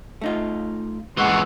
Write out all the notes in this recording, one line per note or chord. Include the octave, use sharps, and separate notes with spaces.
A3 D#4 F4
F#2 E3 G#3 F#5 C6 C#6